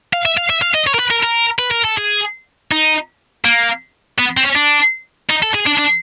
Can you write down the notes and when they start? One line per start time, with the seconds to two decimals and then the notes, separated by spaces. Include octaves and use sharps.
0.13 F5
0.26 E5
0.37 F5
0.50 E5
0.62 F5
0.74 D#5
0.87 C#5
0.94 A#4
0.99 B4
1.11 A#4
1.23 A#4
1.59 B4
1.71 A#4
1.84 A4
1.98 G#4
2.71 D#4
3.45 A#3
4.19 B3
4.37 C4
4.43 C#4
4.55 D4
5.30 D#4
5.43 A4
5.55 G#4
5.67 D4
5.79 D4